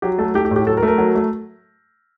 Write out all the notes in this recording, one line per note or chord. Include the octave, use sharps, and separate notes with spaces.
F#3 G4
A3 A4
A3 G4
G4
A2
G4
F#3 A4
A#4
A3
A#4
F#3
A3